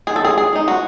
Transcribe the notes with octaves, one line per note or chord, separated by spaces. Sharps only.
D#3 G#4
A4
G#4
G#4
G#3 D#4
F#4